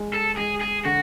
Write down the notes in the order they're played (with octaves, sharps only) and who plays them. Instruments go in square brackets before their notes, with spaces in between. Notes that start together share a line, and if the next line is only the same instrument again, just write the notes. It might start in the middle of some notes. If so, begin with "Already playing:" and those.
Already playing: [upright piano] G#3
[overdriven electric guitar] A4
[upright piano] G#3 [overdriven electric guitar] G#4
[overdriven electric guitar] G#4
[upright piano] D3 [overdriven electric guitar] F#4